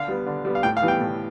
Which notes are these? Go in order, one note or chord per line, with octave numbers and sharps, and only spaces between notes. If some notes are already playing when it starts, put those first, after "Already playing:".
Already playing: D3 F5
G3 B3
D3
G3 B3
F5
A2 G5
F5
E3 G3 B3
G5
A2